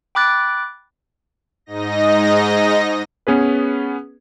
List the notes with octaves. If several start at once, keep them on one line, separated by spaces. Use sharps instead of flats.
G5 B5 D6 F#6 A6
G#2 D#4 D#5 A#6
B3 C#4 G#4 B4